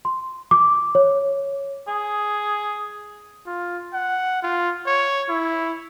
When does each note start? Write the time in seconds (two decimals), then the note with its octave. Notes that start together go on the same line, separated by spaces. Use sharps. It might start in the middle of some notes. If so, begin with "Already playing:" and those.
0.05 C6
0.51 D6
0.95 C#5
1.87 G#4
3.46 F4
3.93 F#5
4.43 F4
4.86 C#5
5.29 E4